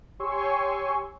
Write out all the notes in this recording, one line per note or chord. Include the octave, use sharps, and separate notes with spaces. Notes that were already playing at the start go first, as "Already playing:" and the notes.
G4 C#5 G#5 C6 C#6 E6